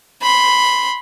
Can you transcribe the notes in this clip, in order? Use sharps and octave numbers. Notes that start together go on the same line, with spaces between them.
B5 C6